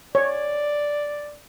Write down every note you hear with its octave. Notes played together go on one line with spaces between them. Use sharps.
C#5 D5